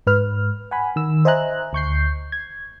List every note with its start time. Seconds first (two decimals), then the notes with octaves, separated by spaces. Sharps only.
0.07 G#2 B4 F6
0.71 F#5 G#5 B5
0.96 D#3 E6
1.25 C5 D#5 E5 G#5 A#5 F#6
1.73 D2 C#6 G6 C7
2.32 G#6